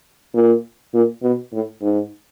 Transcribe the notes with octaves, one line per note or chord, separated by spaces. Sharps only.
A#2
A#2
B2
A2
G#2